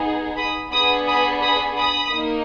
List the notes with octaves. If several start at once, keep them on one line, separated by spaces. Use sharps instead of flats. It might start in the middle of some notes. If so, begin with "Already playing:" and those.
Already playing: B3 D#4 G#4
B5 D#6
B3 D4 G#4 B5 D#6
B5 D#6
B5 D#6
B5 D#6
A#3 D#4